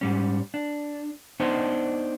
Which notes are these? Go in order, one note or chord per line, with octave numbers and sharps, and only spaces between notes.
G#2 G3 C#4
D4
B3 D4 D#4 C5 C#5 D#5